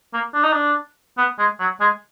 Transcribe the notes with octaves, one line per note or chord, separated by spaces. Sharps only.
A#3
D4
D#4
D4
B3
G#3
F#3
G#3